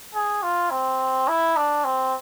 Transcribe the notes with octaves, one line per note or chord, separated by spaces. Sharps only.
G#4
F4
C4
E4
D4
C4